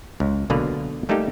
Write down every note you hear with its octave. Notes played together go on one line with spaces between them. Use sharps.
C#2
B1 B2 D3 A#3 B4 F5
G3 A3 A#3 D#4 G4